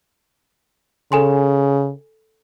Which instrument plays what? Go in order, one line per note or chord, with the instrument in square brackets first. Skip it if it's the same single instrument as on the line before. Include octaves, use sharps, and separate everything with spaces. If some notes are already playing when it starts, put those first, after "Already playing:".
[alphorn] C#3 [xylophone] A4 G#5 C6